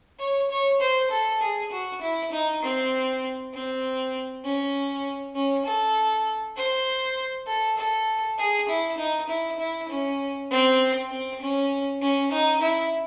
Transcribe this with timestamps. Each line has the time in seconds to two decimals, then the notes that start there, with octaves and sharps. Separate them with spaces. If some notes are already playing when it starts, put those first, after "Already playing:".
0.19 C#5
0.51 C#5
0.80 C5
1.11 A4
1.41 G#4
1.71 F#4
2.02 E4
2.32 D#4
2.62 C4
3.54 C4
4.44 C#4
5.35 C#4
5.65 A4
6.56 C5
7.47 A4
7.78 A4
8.38 G#4
8.69 E4
8.98 D#4
9.29 E4
9.60 E4
9.89 C#4
10.51 C4
11.11 C4
11.41 C#4
12.01 C#4
12.32 D#4
12.62 E4